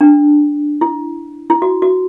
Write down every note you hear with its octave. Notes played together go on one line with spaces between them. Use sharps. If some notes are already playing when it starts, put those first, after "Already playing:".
D4
E4
E4
F#4
F#4